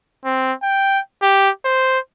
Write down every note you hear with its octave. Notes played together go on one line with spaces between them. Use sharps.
C4
G5
G4
C5